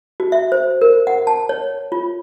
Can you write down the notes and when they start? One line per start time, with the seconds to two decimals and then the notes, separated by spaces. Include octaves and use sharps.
0.20 F#4
0.32 E5
0.52 C5
0.81 A#4
1.07 F#5
1.27 A5
1.49 C#5
1.92 F4